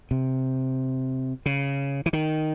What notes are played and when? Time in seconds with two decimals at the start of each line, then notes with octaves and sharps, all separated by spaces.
0.11 C3
1.46 C#3
2.06 E3
2.13 D#3